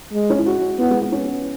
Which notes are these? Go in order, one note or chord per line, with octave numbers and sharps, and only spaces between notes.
G#3
C#4
E4
F#4
B3 E4
G#3
B3
C#4